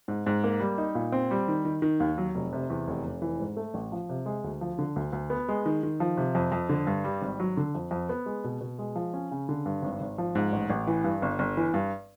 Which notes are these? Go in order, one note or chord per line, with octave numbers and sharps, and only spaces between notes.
G#2
G#2
A#3
G3
D#4
A#2
C4
G3
D#3
D#3
D#3
D#2
F#3
F1
C3
E2
F1
F1
E3
G#2
A3
A1
F3
C3
G#3
D2
F3
D3
D2
D2
B3
G#3
D#3
D#3
F3
C3
F2
F2
D3
G2
G3
G#1
F#3
D3
F2
F2
B3
G#3
B2
B2
G#3
F3
C#4
C#3
D3
G2
G#1
G#1
F3
G#2
A1
A1
E3
G2
G1
G1
E3
G2